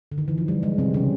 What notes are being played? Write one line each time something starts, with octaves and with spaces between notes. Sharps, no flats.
D3
D#3
E3
F3
G3
G#3
C3 C4
C#3 C#4